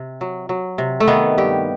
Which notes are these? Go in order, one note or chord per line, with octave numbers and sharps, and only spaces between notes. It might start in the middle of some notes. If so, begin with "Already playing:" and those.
Already playing: C3
F#3
F#3
C3
A3
D#3 B3
G2 G4